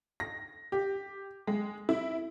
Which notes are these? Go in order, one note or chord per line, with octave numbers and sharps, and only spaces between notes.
A#6
G4
G#3
E4